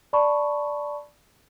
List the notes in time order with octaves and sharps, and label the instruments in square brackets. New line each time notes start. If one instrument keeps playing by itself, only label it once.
[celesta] D5 A5 B5 C#6